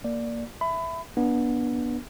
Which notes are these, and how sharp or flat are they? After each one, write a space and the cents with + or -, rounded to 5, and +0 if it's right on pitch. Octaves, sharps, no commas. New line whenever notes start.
A#3 +0 D5 +0
E5 +0 B5 +25
B3 -25 D4 +0